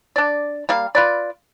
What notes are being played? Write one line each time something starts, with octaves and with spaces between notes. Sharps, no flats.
D4 D5
G3 A#3 F5
F4 B4 D5